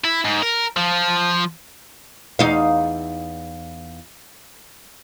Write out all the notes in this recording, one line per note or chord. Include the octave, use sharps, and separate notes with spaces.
E4
G#2
A#4
F3
E2 D#4 F5